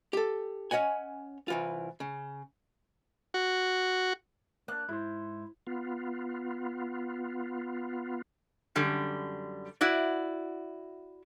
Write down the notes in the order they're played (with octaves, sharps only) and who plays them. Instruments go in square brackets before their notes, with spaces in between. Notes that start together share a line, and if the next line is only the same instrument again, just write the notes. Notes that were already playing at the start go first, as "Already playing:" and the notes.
[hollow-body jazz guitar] G4 A4
C#4 C#5 D#5 F#5 G#5
C2 E3 F4
C#3
[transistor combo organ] F#4
[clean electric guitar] A#3 D4 [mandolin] F#6
[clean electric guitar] G#2 C5 [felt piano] E4
[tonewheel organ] B3 F4
[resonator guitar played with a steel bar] F#2 D3 G3
E4 F#4 D5